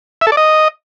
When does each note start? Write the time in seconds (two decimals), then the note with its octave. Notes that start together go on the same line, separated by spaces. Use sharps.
0.21 E5
0.27 A4
0.32 D5
0.37 D#5